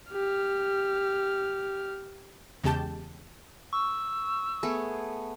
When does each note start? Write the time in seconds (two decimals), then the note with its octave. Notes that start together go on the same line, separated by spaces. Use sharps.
0.13 G4 F6
2.64 E2 C#3 G#3 G4 A5 G6
3.73 C#6 E6
4.63 A3 B3 G#4